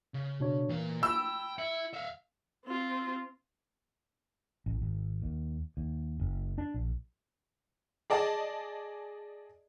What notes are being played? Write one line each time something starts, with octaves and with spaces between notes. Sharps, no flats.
C#3
B2 D4 C#5
A#2 E3 F5
G5 B5 E6
E4 C#7
E5 F5
C4 F4
A1
G#1
D#2
D#2
F#1
D4
A#1
G#4 D5 D#5 A5